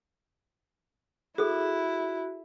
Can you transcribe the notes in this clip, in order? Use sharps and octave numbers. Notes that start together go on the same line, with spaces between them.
E4 F#4 G#4 A4